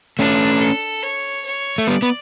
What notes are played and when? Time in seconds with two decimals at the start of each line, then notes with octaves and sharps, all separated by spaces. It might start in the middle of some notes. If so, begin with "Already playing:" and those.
0.19 A3 C#4 D4
0.61 A4
1.03 C#5
1.45 C#5
1.78 A3
1.87 G3 B3 D5
2.02 B3